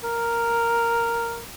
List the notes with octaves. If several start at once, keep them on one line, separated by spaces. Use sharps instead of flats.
A#4